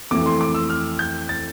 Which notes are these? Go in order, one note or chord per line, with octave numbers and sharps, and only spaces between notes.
F2 E3 A3 E4 D6
C6
D6
E6
F6
G6
A6